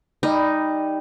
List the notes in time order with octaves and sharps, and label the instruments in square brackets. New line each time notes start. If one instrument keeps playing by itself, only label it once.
[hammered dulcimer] G3 [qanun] D#4